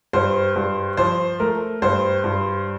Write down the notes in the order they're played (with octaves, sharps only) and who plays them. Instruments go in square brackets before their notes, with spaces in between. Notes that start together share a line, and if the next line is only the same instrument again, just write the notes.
[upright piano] G2 C5
G2
F3 C5
A3 A#4
G2 C5
G2